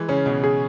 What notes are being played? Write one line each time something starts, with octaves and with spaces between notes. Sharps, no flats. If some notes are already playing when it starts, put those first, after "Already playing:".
Already playing: E3 G#3
C#3 C#4
B2
G#4